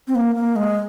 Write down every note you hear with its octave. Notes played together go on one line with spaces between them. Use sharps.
C4
A#3
A#3
G#3